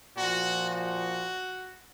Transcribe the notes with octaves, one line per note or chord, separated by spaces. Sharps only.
A#2 F3 F#4
F#4